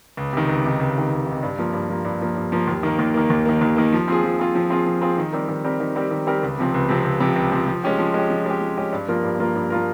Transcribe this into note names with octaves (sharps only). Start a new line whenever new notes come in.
C#2
C3 D#3
C#2
C3 D#3
C#2
C3 D#3
C#2
C3 D#3
G2
F3 A#3
G2
F3 A#3
G2
F3 A#3
G2
F3 A#3
D#2
D#3 A#3
D#2
D#3 A#3
D#2
D#3 A#3
D#2
D#3 A#3
F3
C4 F4 G#4
F3
C4 F4 G#4
F3
C4 F4 G#4
F3
C4 F4 G#4
D#3
G3 C4 G4 A#4
D#3
G3 C4 G4 A#4
D#3
G3 C4 G4 A#4
D#3
G3 C4 G4 A#4
C#2
C3 F3 C4
C#2
C3 F3 C4
C#2
C3 F3 C4
C#2
C3 F3 C4
F3
G#3 C#4 G4
F3
G#3 C#4 G4
F3
G#3 C#4 G4
F3
G#3 C#4 G4
G2
F3 A#3 F4 A#4
G2
F3 A#3 F4 A#4
G2
F3 A#3 F4 A#4